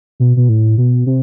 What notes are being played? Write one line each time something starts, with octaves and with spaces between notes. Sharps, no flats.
B2
B2
A2
B2
C3